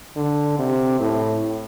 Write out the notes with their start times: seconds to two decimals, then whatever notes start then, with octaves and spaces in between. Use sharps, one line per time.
0.16 D3
0.59 C3
1.01 A2